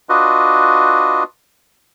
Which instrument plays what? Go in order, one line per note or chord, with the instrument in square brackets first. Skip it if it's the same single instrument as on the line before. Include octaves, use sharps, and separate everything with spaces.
[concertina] D4 F4 F#4 B4 D#5